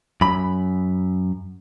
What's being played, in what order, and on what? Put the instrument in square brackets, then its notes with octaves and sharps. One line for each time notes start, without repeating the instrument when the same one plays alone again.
[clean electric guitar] F#2 B5